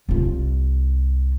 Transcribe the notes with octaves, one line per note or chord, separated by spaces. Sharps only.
C2 F4